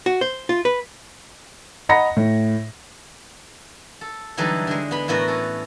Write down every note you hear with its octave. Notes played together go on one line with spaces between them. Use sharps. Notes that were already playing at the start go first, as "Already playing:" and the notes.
F#4
C5
F4
B4
D#5 F#5 A#5 B5 A#6 C#7
A2
A4
D3 E3 F#3 G3 D#4 A4
D3 G#3
B3 B5
A2 E3 B3 F#4 A#4
C#4 A4